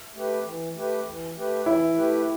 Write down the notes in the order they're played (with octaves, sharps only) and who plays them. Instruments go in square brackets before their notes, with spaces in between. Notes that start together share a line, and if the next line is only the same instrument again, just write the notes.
[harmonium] A3 G4 B4
E3
A3 G4 B4
E3
A3 G4 B4
[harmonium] E3 [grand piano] E4
[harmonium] A3 G4 B4